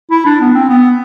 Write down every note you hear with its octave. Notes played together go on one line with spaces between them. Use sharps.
E4
D4
B3
C4
B3